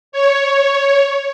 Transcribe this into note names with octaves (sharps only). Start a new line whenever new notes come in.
C#5